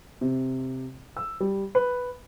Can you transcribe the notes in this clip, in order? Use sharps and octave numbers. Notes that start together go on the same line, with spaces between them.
C3
E6
G3
B4